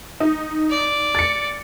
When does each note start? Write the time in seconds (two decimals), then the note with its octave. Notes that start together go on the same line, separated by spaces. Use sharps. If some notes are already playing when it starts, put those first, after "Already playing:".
0.20 D#4
0.70 D5
1.15 A6 C#7